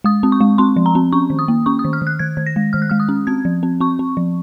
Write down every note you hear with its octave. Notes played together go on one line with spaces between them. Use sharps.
G#3 D#6
C4
C#6
G#3
C4 C6
F3
A#5
C4
C#4 C#6
D#3
D#6
A#3
C#4 C#6
D#6
D#3
F6
D#3
F#6
D#3 G#6
D#3
A#6
G#3
D#3 F6
F#6
G#3 F6
D#6
C#4
C4 G#6
F3
C4
C4 C#6
C4
F3